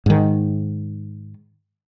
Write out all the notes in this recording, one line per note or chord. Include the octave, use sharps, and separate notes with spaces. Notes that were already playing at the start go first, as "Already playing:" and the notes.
G#2 D#3